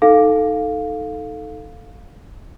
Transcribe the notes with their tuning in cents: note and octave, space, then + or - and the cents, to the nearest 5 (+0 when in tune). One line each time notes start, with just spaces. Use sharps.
D#4 +0 A4 +0 F5 +10